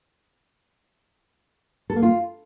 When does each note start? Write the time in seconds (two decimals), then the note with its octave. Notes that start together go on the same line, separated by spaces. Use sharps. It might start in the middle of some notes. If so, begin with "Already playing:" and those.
1.90 A4
1.96 A#3
2.03 F4